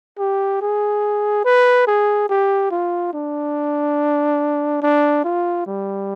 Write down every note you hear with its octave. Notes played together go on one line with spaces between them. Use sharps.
G4
G#4
B4
G#4
G4
F4
D4
D4
F4
G3